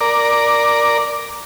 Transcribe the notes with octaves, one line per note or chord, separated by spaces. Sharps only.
A#4 D5